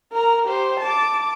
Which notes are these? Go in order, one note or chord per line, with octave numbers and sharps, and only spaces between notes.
A#4 A#5
G4 C5
A5 D6